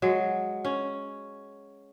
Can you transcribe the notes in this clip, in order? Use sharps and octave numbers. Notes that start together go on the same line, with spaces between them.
F#3 G#3
C#4